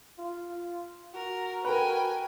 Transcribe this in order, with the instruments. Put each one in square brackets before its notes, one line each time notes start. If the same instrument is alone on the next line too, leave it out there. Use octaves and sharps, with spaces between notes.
[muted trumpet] F4
[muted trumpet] F#4 [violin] A#4
[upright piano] A#4 B4 [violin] G5 G#5